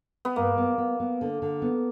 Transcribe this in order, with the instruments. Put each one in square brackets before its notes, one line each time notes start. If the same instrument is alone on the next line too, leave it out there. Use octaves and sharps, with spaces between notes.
[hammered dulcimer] B3
[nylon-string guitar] G2 [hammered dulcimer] A#3
[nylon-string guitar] B3
B3
B3
D3
D3
B3